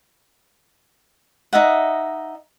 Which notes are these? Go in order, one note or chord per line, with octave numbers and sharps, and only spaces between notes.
D#4 D#5 E5 F#5